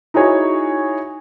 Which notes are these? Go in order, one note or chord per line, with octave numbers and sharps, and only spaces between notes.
D#4 E4 F#4 G#4 C#5